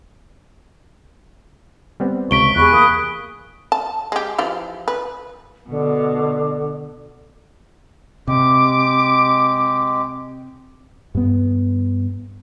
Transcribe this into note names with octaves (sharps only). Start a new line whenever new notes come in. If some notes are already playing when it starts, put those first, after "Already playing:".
G3 B3 C4
C#2 C3 C#6 B6 D7 G7
E2 G4 G#4 B5 F#6
A#3 D#6
A5
G#3 G4
E3 F3 G4
B4
B2 D3
C3 G#3 G4 D6
G2 B3